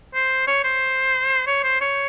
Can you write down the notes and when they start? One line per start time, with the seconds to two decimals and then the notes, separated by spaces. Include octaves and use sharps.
0.14 C5
0.47 C#5
0.64 C5
1.47 C#5
1.64 C5
1.81 C#5